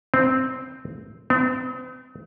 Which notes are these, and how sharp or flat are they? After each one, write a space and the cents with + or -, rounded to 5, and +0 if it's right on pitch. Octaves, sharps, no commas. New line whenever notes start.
C4 -5
C4 -45